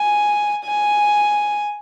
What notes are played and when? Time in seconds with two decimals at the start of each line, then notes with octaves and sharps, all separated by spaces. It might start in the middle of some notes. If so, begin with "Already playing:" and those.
Already playing: G#5
0.65 G#5